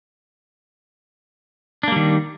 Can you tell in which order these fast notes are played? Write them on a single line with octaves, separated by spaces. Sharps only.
D4 A#3 G3 D#3